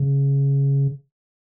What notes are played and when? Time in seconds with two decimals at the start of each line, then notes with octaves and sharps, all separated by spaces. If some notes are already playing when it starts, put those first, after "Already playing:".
Already playing: C#3